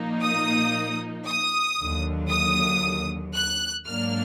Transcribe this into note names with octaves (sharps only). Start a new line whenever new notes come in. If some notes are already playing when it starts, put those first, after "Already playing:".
Already playing: A#2 F3 A#3 D#4
D#6
D#6
D#2 D3 F#3
D#6
F#6
G#2 F#3 A#3 D4 F6